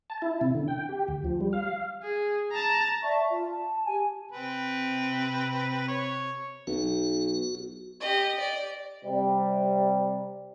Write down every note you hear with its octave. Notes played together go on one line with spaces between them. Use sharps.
A5
E4
C3
D3
G5
G4
D2
F3
G3
F5
G#4
A5 A#5
D5 E5 A5 C#6
F4
A5
G4 G#5
C3 C4 B4
C#5
B1 F#4
G4 D#5
D5
C3 G3